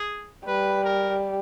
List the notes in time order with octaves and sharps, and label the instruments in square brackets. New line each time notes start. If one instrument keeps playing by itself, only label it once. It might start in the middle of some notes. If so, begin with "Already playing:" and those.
Already playing: [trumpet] G#4
[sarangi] G3 [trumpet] B4
[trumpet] A#4